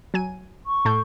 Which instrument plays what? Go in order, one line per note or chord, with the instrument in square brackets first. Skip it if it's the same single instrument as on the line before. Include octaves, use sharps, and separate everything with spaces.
[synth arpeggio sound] F#3 G#5 D#7
[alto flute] C#6
[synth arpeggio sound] A2 A4 G6